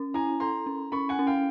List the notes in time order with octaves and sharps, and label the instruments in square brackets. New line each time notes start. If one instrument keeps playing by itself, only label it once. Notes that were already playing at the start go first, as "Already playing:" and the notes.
Already playing: [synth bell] C#4
[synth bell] E4 [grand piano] G#5 A#5
[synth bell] A4 [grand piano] A#5 C6
[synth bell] C#4
[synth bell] C#4 [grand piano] B5 C#6
[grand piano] F#5 G#5
[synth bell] C#4
[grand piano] F5 G5